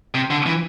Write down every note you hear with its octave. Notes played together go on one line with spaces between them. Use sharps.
C3
D3
E3